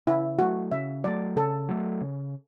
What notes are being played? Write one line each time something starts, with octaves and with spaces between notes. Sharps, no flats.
C#3 E4
F#3 A3 F#4
C#3 E5
F#3 A3 D5
C#3 A4
F#3 A3
C#3